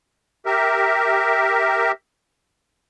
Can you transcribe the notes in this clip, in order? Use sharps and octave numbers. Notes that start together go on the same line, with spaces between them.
G4 A#4 E5